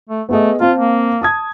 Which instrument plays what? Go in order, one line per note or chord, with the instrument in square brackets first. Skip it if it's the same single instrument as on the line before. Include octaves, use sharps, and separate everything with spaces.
[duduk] A3
[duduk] A3 [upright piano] B3 G#4 D#5
[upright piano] C4 F5 A5 [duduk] F4
[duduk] A#3
[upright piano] A5 D#6 G#6